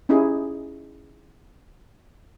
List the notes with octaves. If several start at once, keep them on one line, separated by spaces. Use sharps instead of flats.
C#4 D#4 E4 G4 G#4